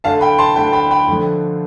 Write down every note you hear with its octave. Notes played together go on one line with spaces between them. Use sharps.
D2 D3 A3 F5 A5
G5 B5
A5 C6
D2 D3 A3 G5 B5
G5 B5
G5 B5
D2 D3 F3 A3